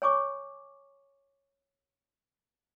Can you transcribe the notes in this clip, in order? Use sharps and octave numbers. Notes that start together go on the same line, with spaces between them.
C#5 G#5 C#6 D6